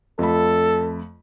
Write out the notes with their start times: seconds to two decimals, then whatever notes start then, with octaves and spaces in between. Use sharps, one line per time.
0.19 F2 A3 A4 B5